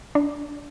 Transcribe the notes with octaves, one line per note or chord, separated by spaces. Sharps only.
D4